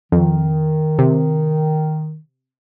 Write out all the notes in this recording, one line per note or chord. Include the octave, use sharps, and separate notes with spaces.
F2 D#3
C3